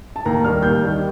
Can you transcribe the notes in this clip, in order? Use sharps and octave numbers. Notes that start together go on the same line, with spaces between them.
A5
D#2 A#5
D#3 G3 F6
D#2 G6
D#3 G3